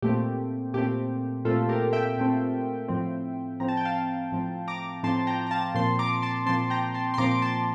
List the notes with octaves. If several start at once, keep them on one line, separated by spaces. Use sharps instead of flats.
A#2 A3 C4 G4
A#2 A3 C4 G4
A#2 A3 C4 F4 A4
G4 A#4
E5 G5
A#2 A3 C4
A2 F3 C4
A2 F3 C4 A#5
A5
G5
F5 A5
A2 F3 C4
A#5 D6
A2 F3 C4 A5 C6
G5 A#5
A#5
F5 A5
A#2 F3 C4 A5 C6
A#5 D6
A5 C6
A#2 F3 C4 A5 C6
G5 A#5
A5 C6
C6
A#2 F3 C4 A#5 D6
D6
A5 C6